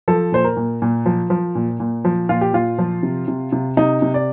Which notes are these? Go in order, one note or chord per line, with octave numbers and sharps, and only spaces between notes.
F3 A4
A#2 C5
A#4
A#2
A#2
F3
F3
A#2
A#2
F3
A#2 F4
G4
A#2 F4
F3
C3
C3
C3
C3 D#4
C3
D5